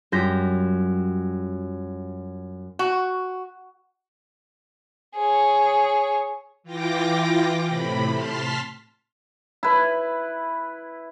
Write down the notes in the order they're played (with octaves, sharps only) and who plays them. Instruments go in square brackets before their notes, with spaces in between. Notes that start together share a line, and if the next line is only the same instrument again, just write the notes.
[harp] F#2 G3 F4 G6 A#6 B6
[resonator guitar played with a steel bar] F#4
[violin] G#4 C#5
[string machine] E3 F4 G5 D6 A#6
A2 C3 B5
A5 C6 F6 B6
[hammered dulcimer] E4 B4